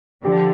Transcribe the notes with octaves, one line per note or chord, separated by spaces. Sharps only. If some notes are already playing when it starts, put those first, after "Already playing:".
D3 F3 G4